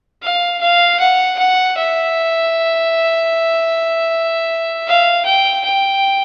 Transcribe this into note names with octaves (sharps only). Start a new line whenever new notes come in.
F5
F5
F#5
F#5
E5
F5
G5
G5